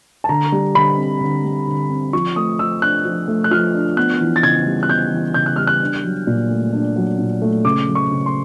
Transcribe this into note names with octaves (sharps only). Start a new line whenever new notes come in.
A5
D3 A#5
G3
D3 B5
C4
D3
G3
D3
C4
F3 C#6
A3 D#6
F3 E6
D4 F#6
F3
A3
F#6
F3 F6
D4
B3 F#6
E3
A6
C#3 G#6
G3
F#6
B3 G6
E3
C#3 G6
F#6
G3 F6
F#6
D4
F#3
A#2
A3
D4
F#3
A#2
A3
C#3 D6
F#3
C#6
C#3
C6